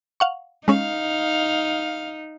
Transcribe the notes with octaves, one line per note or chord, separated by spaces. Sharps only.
F5 F#5 C#6
G#3 C#4 D#4 F5